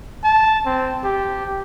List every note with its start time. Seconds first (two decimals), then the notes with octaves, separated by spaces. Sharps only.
0.24 A5
0.66 C4
1.04 G4